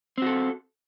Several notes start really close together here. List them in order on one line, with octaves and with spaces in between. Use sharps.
C4 F#4 A4